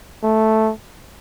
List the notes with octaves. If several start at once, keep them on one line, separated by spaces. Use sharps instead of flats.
A3